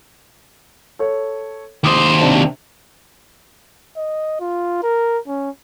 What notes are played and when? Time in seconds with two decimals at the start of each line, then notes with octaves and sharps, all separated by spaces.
0.99 A4 C#5
1.84 D#2 C5 D6 D#6
2.19 C3 D4 A5
3.96 D#5
4.40 F4
4.83 A#4
5.27 C#4